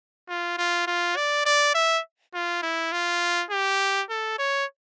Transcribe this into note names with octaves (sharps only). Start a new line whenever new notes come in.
F4
F4
F4
D5
D5
E5
F4
E4
F4
G4
A4
C#5